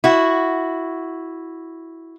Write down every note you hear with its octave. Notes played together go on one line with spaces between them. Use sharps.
E4 F#4